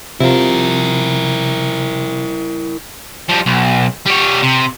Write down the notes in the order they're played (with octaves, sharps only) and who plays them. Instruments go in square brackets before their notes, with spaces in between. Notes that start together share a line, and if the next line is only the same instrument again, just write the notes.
[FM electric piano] C3 F3 [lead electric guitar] E4 A#4
[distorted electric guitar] F3 G3
B1
G3 C#5
C3